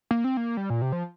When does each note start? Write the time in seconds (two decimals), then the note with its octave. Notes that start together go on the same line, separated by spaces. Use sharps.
0.11 A#3
0.24 C4
0.37 A#3
0.57 G3
0.70 A#2
0.82 C3
0.92 F3